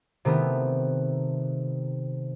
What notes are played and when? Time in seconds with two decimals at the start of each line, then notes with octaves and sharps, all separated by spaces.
0.25 C3 D#3 A3 B3